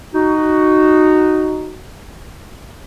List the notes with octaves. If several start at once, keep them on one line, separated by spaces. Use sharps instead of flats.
D#4 F#4